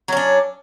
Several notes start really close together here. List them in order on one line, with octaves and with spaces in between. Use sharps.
F#3 C#4 D4